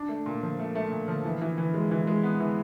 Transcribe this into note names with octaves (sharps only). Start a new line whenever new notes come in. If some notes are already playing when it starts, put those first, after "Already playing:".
Already playing: D4
A3
A#2
F3
A3
A3
A#2
F3
E3
E3
E3
G#3
E3
G#3
B3
E3